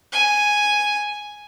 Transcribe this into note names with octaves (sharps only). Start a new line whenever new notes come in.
G#5